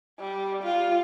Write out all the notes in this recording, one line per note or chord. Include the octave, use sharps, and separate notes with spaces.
G3
F4